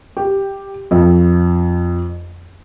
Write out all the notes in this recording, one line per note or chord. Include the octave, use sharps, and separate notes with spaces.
G4
F2